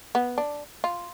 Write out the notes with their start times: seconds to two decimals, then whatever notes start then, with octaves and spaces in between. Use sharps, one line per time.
0.15 B3
0.38 D4
0.84 F4